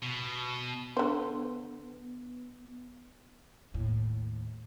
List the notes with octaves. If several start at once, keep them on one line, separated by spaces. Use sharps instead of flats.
B2
D3 B3 C5
D#2 A2